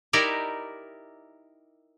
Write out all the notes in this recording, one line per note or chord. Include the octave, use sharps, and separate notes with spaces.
D#4 E4 G4 A#4 D5